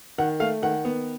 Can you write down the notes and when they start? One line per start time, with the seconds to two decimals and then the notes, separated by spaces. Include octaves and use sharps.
0.18 D#3 F#5
0.40 A3 F5
0.62 D#3 F#5
0.85 B3